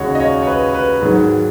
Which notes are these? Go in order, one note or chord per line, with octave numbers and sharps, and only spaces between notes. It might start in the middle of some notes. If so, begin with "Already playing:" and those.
Already playing: D#2 C#3 G#3 D#4 F#4 C#5
D#5
C#5
C#5
B4
B4
G#2 D#3 F#3